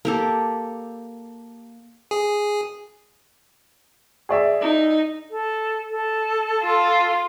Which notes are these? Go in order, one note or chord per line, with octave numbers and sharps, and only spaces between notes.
A#3 G4 A4
G#4
G#4 D5 E5
D#4
A4
A4
F4